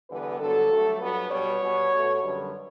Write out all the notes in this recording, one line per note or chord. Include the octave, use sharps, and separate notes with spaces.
E2 D3 G3 B3 B4
G2 D3 F#3 B3 A4
G2 F#3 A3
G2 F#3 B3 B4
B2 G3 B3 C#5
B2 G3 B3
B2 A3
F#2 D3 G3 B3